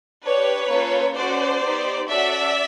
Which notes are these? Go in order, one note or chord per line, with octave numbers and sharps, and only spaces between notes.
D4 G4 B4 C#5
A#3 C#4 F4 A4
C#4 F#4 A4 C5 D5
B3 D#4 G4
C#4 F#4 A4 D5 E5